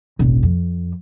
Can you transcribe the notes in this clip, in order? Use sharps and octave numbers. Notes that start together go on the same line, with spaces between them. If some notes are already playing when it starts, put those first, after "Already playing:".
E1 A1
F2